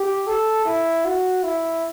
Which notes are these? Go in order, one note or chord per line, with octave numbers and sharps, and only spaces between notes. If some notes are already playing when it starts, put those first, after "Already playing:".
Already playing: G4
A4
E4
F#4
E4